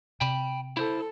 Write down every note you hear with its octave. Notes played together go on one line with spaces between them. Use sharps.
C3 G5 B5
E4 A4 C5